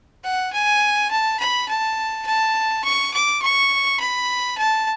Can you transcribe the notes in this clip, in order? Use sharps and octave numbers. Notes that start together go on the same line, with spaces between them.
F#5
G#5
A5
B5
A5
A5
C#6
D6
C#6
B5
A5